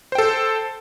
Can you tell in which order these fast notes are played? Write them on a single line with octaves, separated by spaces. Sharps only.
C5 G5 A4